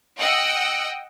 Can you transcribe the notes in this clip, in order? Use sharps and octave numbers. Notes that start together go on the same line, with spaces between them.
D#5 F#5 G5 E6